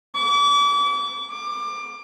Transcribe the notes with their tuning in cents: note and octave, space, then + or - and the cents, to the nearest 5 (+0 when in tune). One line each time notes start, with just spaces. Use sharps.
D6 -35
D6 +20